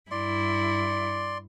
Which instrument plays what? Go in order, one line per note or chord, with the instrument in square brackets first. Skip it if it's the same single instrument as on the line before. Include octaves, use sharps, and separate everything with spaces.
[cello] G2 E4 [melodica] D5 C6